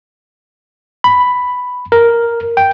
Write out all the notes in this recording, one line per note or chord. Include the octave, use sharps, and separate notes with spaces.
B5
A#4
G5